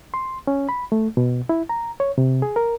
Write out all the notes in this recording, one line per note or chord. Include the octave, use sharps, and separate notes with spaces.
C6
C#4
B5
A3
B2
E4
A#5
C#5
C3
G#4
A#4